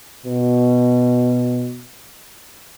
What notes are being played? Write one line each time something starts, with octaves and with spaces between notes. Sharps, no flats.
B2